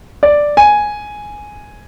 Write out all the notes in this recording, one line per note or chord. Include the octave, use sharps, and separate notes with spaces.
D5
G#5